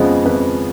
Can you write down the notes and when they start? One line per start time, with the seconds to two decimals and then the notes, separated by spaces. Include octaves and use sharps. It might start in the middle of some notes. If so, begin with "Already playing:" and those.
Already playing: F2 C#3 F3 G#3 B3 C#5 D#5
0.25 F2 B4